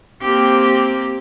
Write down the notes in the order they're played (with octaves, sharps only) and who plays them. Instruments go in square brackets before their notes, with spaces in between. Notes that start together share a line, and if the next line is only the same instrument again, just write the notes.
[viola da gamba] A#3 C4 G4